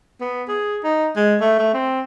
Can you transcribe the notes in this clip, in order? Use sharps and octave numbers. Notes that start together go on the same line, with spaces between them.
B3
G#4
D#4
G#3
A3
A3
C4